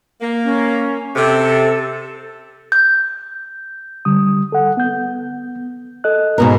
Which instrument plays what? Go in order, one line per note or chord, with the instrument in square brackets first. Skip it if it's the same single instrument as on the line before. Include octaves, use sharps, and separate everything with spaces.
[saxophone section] A#3
[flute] C#4
[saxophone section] C3 [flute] A4
[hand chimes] G6
[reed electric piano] D3 G3 D#6
A4 F#5
B3 G6
A4 D#5 F#6
[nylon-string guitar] G#2 B2 A#4 [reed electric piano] B4